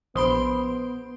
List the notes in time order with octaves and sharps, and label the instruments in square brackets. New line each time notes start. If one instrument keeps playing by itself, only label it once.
[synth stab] A#1 C6 D7 [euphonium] B3 [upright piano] C5 [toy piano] B5 D#6